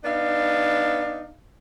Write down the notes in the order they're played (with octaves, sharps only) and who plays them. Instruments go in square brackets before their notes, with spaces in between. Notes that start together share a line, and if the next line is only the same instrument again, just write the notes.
[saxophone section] B3 D4 D#4 F5